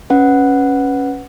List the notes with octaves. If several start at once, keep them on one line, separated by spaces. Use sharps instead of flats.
C#4 B4 F#5